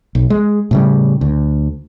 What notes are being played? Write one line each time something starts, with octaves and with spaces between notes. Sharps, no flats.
B1
G#3
A2 C#3 G3
D2